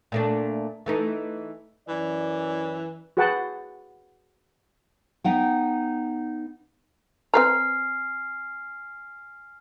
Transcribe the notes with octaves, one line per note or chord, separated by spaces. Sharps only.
A#2 A3 D4
E3 A3 D#4
F#2 E3 C#4 D5
F#4 G#4 B4 F#5 G5 A5
B3 D#4 F#5 G5
C4 B4 G#5 A#5 F6 C7